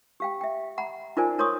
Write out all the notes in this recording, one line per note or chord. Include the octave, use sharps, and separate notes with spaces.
G4 F5 G5
E5 G5
F#5 A#5 B5
D#4 F4 A#4 C5 D5 G#5
D#4 A#4 C#5 C6 C#6 D#6